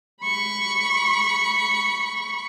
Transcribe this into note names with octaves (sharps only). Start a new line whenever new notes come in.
B5 C#6